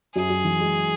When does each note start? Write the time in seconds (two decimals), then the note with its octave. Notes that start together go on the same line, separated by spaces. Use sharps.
0.15 F#2 G#4
0.30 F#2
0.45 E3
0.60 G#3